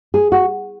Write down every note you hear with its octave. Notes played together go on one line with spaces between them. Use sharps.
G#4
F#4